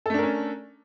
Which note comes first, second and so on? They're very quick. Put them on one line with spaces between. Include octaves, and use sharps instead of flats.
A4 A3 D4 A#4 C#4